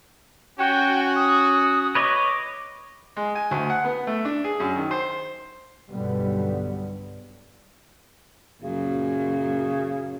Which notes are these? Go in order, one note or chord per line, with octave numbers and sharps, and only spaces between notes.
C#4 F#4 G5
D#6
B4 C#5 D#5 D6
G#3
G#5
D2
F#5
B3
A3
D4
G#4
F#2
D#3
C5
B1 G2 B2 D3 G3 B3
F#2 A#2 C#3 F#3